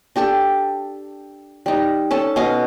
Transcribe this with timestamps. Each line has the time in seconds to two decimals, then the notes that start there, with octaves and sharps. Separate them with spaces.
0.16 D4 G4 A4 A5
1.66 G3 D#4
2.11 C#4 A4 A5
2.36 B2 C#4 D#5 F5